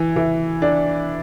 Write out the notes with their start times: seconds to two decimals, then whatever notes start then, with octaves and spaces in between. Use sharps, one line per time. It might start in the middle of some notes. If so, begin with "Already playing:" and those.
Already playing: E3
0.16 E3
0.62 D4